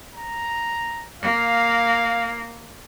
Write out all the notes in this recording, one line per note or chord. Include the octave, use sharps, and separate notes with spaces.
A#5
A#3 F5